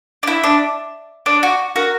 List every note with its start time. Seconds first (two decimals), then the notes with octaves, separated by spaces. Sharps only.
0.23 D4
0.27 E4
0.44 D4
1.26 D4
1.43 F#4
1.76 F#4 A#4